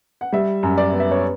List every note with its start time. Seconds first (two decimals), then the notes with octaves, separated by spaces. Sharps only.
0.21 F#5
0.33 G3 E5
0.63 F#2
0.78 D5
0.93 B3
1.00 E5
1.11 C#5